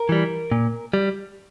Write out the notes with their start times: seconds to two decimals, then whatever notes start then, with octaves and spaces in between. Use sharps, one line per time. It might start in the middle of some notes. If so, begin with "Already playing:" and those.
Already playing: A#4
0.09 E3 G3
0.51 A#2
0.94 G3